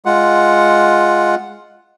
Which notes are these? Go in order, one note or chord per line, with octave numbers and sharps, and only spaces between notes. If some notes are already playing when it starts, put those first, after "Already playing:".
G#3 F4 F#5